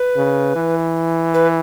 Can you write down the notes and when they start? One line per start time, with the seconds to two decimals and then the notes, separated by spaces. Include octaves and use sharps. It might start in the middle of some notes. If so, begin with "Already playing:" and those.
Already playing: B4
0.16 C#3
0.56 E3
1.34 B4